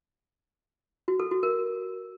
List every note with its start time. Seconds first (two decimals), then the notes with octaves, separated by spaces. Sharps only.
1.08 F#4
1.20 A4
1.31 F#4
1.43 A#4